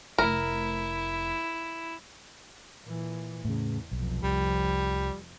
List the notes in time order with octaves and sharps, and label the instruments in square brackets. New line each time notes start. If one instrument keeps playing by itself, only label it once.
[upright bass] F1 A3 [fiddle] E4 [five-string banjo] A#4
[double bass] A#2 E3
[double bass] E2 [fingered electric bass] A2 C#3
[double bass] F1 F3 [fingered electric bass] B1
[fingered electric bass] C2 [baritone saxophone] G3